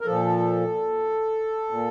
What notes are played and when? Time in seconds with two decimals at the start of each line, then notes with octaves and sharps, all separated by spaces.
0.01 A#4
0.05 A#2 F3 A4
1.71 A#2